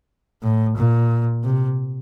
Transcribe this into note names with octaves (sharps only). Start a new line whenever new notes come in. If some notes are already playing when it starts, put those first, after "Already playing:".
A2
A#2
C3